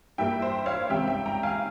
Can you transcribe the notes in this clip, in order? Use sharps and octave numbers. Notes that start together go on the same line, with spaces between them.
G2 G3 A#3 E4 E5 G5
C5 E5
C#5 F5
C#2 C3 G3 C4 E5 G5
E5 G5
G5 A#5
F5 G#5